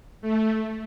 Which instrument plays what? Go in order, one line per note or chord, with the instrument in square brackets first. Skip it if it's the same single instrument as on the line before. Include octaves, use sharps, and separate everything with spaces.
[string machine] A3